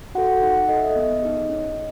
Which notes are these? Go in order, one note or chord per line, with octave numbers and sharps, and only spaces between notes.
F#4 A4 F#5
D#4 F#5
A4 D#5
E5
D#5
B3
D#4 G#4
C#4